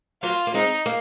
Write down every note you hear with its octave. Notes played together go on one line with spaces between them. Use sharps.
F#3 A#3 F4
A#3
G#3 C4 D#4
A#3